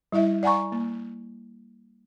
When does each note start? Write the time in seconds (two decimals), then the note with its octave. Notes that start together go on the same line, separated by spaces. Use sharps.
0.12 G3 E4 D#5 E5
0.43 D5 F#5 G#5 A#5 C#6
0.72 A#3